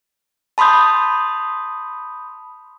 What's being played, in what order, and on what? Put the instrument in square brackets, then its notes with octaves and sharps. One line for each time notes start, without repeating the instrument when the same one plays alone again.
[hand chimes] A5 B5 C6 D#6 G6